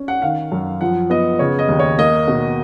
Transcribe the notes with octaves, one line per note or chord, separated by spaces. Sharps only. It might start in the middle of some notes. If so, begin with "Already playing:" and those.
Already playing: C#4
F#5
D#3 F5
F#2
F3 F#5
B3 D#5
C#3 C#5
D#5
D#2
C#5
A#3 D#5
B2